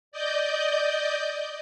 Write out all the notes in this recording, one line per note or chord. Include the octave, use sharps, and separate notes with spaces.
D5 D#5 G6